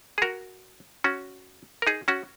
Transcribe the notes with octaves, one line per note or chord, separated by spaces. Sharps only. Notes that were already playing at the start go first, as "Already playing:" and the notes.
G#4
F#4 A#4
C#4 F#4
A#4
D#4 G#4
C#4 F#4